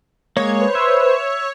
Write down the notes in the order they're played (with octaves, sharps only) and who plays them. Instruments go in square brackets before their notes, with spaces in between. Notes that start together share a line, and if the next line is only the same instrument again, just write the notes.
[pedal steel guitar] G#3 A#3 [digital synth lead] C#5
[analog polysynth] B4 C5
[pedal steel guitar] E5